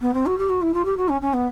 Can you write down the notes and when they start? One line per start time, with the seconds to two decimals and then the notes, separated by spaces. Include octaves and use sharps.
0.01 B3
0.13 C4
0.26 F#4
0.37 G4
0.49 F#4
0.61 E4
0.73 F4
0.85 G4
0.97 F#4
1.08 C#4
1.21 C#4
1.33 B3